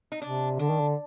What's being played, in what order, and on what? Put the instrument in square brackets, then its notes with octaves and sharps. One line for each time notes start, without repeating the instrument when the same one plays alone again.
[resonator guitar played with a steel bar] D#4
[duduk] C3 [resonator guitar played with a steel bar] D4
[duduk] D3 [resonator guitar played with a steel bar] D4
[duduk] D#3
D3